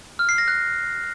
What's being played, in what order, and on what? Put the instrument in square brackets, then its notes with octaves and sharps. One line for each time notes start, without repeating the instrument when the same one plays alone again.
[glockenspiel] F6
C7
A#6
F#6